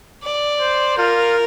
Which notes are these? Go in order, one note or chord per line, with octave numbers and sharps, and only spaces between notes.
D5
C5
F4 A#4